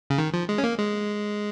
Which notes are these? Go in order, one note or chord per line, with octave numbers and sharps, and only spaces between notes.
C#3
D#3
F3
G#3
C#4
A#3
G#3